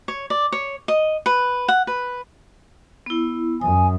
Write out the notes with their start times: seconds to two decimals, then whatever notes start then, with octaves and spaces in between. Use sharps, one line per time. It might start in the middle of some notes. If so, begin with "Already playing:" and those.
0.08 C#5
0.30 D5
0.52 C#5
0.88 D#5
1.26 B4
1.68 F#5
1.87 B4
3.06 B3 E4
3.61 F#2 G#5 D#6